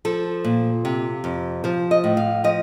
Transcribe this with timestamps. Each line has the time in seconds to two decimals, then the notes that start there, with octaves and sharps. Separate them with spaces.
0.05 F3 A4
0.45 A#2
0.85 C3
1.24 F2
1.64 F3 C5
1.91 D#5
2.04 A2
2.17 F5
2.44 F3 D#5